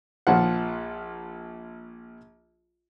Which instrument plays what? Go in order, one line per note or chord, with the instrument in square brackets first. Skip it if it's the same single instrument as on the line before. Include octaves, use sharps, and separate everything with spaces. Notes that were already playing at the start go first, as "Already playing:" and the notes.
[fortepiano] A#1 F3 F#5